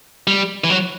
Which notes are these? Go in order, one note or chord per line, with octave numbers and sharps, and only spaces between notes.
G3
E3
F#3